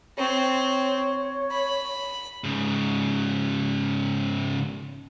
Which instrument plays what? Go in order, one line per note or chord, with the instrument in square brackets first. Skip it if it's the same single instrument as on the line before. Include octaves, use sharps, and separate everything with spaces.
[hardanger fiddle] C4 [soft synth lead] C#5
[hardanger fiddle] B5
[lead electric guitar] G#2 C#3